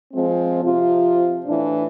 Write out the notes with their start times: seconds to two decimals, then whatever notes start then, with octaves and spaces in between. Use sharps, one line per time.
0.13 F3 G#3 C4
0.64 C3 F3 F4
1.46 A2 E3 D4